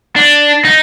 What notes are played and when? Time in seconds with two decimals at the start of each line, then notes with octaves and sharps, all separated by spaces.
0.16 D4
0.65 D#4